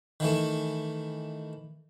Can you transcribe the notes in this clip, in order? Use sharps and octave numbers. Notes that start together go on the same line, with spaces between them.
D#3 E3 A3